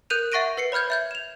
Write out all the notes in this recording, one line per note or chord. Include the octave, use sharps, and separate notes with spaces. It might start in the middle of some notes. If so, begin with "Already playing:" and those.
A#4 F#6 G6 D#7 F7
E5 F#5 C#6 A#6 D7 D#7
B4 C7 C#7
C#5 B5 F6 G6 G#6
E5 G6 G#6
E7 F7